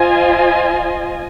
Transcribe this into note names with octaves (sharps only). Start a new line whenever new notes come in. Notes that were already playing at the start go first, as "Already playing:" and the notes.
Already playing: F4 C5 D#5 G#5